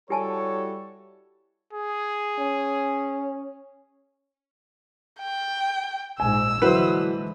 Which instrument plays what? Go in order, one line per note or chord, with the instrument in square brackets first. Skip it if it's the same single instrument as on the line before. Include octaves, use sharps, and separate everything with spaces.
[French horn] G3 [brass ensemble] E4 F#4 A4 [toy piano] G4 G#5 A5 [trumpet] C#5
[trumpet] G#4
[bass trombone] C#4
[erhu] G5
[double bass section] A#1 G#2 [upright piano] G#5 [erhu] E6
[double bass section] D3 E3 G#3 [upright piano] F#3 E4 [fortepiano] B4 C5